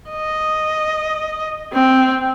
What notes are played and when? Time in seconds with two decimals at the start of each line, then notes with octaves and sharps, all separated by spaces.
0.11 D#5
1.73 C4